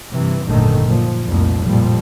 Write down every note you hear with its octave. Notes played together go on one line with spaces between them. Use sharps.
G2 C3 E3
G#1 F#2 A#2 D3 D#3 A3
A#2 F3
F1 C2 F2 A#2 F3
A1 F2 A#2 F3 G3